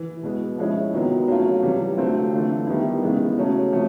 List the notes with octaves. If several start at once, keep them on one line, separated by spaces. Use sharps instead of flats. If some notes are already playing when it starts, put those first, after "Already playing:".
Already playing: E3
B2 G#3 B3
F3 G#3 C#4 E4
C3 D#3 F#3 B3
F#3 A3 C#4 F4
C3 E3 G3
D3 F#3 A3 C4 F4
E3 A3 D4 F4
D#3 G3 B3 E4
C#3 E3 G#3 B3
C#3 F#3 A3 C#4
C3 F3 A3